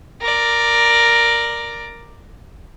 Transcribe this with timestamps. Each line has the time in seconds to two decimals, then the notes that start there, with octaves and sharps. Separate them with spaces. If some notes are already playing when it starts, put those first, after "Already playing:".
0.21 A#4 D5